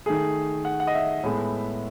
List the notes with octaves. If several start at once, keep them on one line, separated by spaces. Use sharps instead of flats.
D#3 A3 G#4
F#5
F#5
D#5
E5
A2 G#3 B3